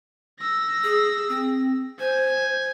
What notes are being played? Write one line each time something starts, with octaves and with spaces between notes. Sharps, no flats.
E6 A#6
G#4
C4
C5 G#5